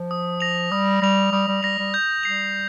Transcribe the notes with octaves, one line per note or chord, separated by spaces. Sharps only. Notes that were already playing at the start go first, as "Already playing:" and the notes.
Already playing: F3
D#6
A#6 F7
G3 D#6
G3 A#6 F7
G3 D#6
G3
G3 A#6 F7
G3
G6
G3 C7 F7